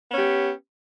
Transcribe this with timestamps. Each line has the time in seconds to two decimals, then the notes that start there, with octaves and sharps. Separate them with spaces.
0.09 B3
0.13 C#4
0.17 G4